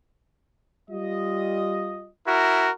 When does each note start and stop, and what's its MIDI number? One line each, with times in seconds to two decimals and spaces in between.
0.90 2.09 55
0.90 2.09 65
0.90 2.09 75
2.27 2.70 64
2.27 2.70 66
2.27 2.70 70